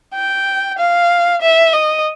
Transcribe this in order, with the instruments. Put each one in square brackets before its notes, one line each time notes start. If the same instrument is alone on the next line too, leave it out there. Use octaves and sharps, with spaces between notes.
[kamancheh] G5
F5
E5
D#5